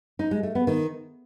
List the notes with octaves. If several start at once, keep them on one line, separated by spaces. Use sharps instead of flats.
D#4
G#3
A3
B3
D#3